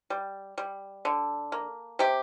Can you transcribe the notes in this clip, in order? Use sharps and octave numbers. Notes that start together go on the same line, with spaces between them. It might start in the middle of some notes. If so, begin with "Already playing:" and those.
G3
G3
D3
A#3
C3 G4